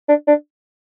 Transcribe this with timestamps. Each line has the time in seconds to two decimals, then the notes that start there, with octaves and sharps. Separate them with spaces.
0.09 D4
0.28 D4